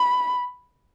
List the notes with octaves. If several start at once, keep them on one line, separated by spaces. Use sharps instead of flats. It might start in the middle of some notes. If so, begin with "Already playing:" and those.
Already playing: B5